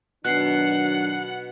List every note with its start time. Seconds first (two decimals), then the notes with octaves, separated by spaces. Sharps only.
0.25 B2 D#3 F#3 D4 F#5 F#6 C7